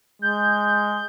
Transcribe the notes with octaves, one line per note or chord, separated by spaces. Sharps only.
G#3 G6